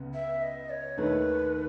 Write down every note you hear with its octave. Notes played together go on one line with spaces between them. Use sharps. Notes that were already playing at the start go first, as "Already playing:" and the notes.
Already playing: C#2 C#3 B3
E5
D#5
C#5
D#2 D#3 A3 B4